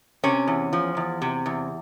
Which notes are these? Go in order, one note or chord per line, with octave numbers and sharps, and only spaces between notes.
C3 C#4
E2
F3
E2
C3
E2